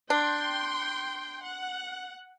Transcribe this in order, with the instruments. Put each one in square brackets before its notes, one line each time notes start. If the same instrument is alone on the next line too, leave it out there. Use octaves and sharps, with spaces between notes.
[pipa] D4 [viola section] G5 C6
[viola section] F#5